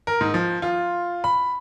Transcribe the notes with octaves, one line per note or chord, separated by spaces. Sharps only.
A#4
G#2
F3
F4
B5